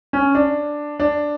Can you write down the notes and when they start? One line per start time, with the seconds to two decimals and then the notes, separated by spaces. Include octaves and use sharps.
0.13 C#4
0.35 D4
1.00 D4